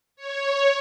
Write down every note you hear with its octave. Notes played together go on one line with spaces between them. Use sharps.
C#5